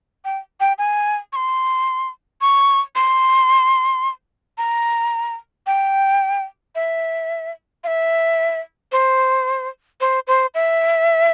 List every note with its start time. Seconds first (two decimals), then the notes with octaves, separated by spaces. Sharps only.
0.25 G5
0.60 G5
0.78 G#5
1.33 C#6
1.36 C6
2.41 C#6
2.95 C6
4.58 A#5
5.67 G5
6.75 E5
7.84 F5
7.87 E5
8.92 C5
10.01 C5
10.27 C5
10.54 E5